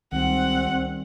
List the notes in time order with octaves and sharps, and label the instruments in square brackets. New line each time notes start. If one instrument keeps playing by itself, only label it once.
[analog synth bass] C#2 [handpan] D#3 G3 [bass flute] C4 [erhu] F#5